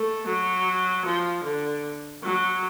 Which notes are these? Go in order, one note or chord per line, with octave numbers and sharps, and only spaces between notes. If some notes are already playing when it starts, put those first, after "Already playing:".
Already playing: A3
F#3
F3
D3
F#3